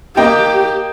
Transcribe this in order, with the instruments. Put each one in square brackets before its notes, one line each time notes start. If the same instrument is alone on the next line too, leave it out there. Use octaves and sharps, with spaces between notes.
[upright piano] A#3 D#5 G5 [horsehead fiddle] G4